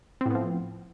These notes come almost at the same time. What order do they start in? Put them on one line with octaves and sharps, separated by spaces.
C4 A2 B3 F3